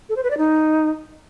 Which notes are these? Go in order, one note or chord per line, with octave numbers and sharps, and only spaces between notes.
A4
C5
B4
D5
D#4